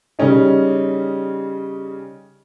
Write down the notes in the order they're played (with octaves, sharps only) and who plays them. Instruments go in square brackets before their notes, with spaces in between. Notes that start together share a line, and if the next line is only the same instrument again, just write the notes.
[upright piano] C#3 G3 C#4 D#4